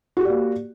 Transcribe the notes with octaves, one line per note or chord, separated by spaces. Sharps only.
A#3 F#4 G4 D5